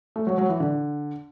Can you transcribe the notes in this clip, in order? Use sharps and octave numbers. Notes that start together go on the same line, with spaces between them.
A3
F#3
F#3
E3
D3